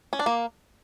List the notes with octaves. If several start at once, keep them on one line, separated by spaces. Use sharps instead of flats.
C#4
D4
A#3